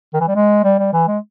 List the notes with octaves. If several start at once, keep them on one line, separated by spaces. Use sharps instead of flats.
D#3
E3
G3
G#3
G3
G3
E3
G#3